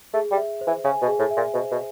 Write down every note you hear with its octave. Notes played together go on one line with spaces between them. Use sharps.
A3 G#4
G3
E5
C5
E3
C#3 G#5
B2
G#4
A2
E5
A#2
B2 C5
B2